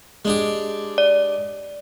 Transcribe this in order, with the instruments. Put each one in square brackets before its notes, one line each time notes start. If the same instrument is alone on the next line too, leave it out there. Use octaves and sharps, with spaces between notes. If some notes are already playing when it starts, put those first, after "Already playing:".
[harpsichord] G#3 D4 G4
[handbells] D5